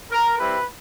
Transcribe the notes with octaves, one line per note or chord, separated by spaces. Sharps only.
A#4
G3 C4 E4 G4 B4